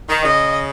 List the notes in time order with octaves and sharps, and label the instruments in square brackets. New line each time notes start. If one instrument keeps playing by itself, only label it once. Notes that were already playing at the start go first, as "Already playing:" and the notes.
[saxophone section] D#3
[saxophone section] C#3 [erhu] D#5